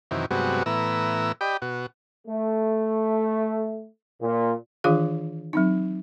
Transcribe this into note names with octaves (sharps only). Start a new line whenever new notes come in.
F#2 C3 D#3 E3
G2 C3 F#3 G#3 B3 F#4
A2 E3 B3 A#5 E6
G4 D5 D#5 G5 B5
B2 F#4
A3
A#2
D#3 E3 D4 F4 G#4 F5
F#3 C4 D#4